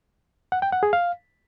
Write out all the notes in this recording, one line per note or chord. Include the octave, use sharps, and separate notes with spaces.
F#5
G5
F#5
G#4
F5